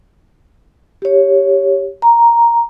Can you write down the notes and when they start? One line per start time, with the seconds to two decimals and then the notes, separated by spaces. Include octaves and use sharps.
1.02 G4 C#5
2.02 A#5